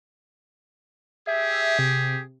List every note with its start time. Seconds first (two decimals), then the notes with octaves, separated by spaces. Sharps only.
1.27 G4 G#4 E5
1.79 C3